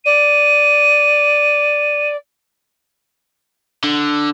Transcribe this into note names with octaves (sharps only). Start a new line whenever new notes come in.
D5 D#7
D3